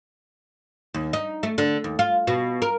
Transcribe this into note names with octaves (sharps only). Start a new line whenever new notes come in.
D#2
D#4
A3
D3
D#2
F4
B2
A#4